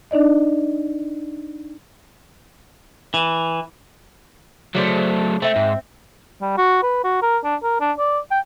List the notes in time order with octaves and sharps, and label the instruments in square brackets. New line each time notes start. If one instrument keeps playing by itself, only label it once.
[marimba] D4 D#4 D5 D#5
[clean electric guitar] E3
[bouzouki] C#3 D4 C5 [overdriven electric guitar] F#3 A3
[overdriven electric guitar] A3 [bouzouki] C4 E5
[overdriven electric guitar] G#2
[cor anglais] G3
F#4
B4
F#4
A#4
D4
A#4
D4
D5
G5